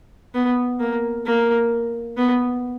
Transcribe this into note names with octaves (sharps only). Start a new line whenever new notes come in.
B3
A#3
A#3
B3